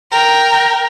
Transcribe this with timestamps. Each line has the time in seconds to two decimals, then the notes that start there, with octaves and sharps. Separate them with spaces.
0.12 A#4 G5